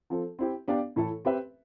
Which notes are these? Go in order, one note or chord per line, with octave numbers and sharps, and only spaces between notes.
F3 C4 F4 A4
C4 E4 G4
B3 D4 G4 D5 F5
A2 E3 A3 E4 A4
C4 G4 B4 E5